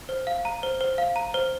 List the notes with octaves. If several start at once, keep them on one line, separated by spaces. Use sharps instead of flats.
C5
F5
A#5
C5
C5
F5
A#5
C5